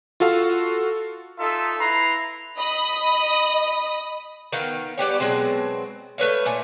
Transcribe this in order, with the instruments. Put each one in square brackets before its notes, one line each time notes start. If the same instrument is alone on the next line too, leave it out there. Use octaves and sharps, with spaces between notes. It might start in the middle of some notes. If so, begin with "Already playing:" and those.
[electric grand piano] F4 F#4 A4 F5
[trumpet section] D#4 F4 A4 E5
E4 B4 A#5 C6
[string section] D#5 B5 D#6
[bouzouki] D#3 B3 F5
G3 B3 G4 C#5
B2 F#3 G#3 C4
A3 B4 C#5 F5
A#2 A3 G#5